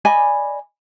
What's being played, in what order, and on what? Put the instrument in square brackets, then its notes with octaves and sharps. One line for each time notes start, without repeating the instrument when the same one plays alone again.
[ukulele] D5 D#5 G#5 B5